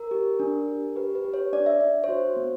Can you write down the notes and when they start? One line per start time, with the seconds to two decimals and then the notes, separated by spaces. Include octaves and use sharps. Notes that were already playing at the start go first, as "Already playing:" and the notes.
Already playing: A#4
0.11 G4
0.40 D4
0.68 G4
0.96 G4 B4
1.15 B4
1.25 G4
1.34 C#5
1.52 D4 D5
1.66 E5
1.81 D4 E5
2.04 C#5
2.09 F#4 C5
2.36 B3